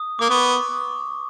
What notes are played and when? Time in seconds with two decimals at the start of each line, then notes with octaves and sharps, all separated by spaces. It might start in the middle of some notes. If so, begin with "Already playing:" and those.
Already playing: D#6
0.19 A#3 D6
0.29 B3 C#6